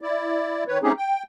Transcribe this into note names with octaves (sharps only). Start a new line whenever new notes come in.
E4 D5
D#3 B4 C#5
A3 C4 C#4 D#4 G4 G#4
G5